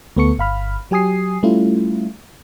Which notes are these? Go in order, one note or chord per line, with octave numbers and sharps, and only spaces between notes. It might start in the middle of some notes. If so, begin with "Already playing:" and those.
D2 A3 B3 A4 C#6 C#7
G1 F5 B5 F6
F#3 G4 G#5 D#6 C7
G3 A3 C#4 E4 F4